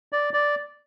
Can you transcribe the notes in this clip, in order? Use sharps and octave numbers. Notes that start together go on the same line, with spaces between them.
D5
D5